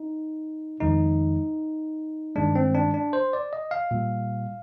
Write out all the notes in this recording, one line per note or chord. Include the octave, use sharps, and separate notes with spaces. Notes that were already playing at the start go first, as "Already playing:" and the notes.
Already playing: D#4
F2 D#3 G#3 D#4
G2 D#3 G#3 D4
C4
D4
D4
C5
D5
D#5
F5
A#2 G3